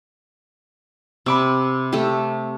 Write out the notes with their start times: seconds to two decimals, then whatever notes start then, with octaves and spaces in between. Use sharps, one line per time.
1.26 C3 B5 D6 E6
1.93 A3 G4